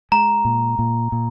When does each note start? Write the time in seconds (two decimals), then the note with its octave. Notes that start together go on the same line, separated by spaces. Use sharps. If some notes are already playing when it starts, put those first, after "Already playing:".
0.12 G#3 A#5
0.45 A#2
0.79 A#2
1.12 A#2